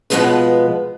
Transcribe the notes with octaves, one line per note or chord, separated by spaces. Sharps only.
B2 D3 F3 G#3 B3 B4